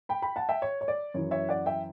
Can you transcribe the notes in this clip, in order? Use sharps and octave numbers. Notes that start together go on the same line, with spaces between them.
G5 B5
G5 B5
F#5 A5
E5 G5
C#5
C#5
D5
F#2 E3 C#5
C#5 E5
D5 F#5
E5 G5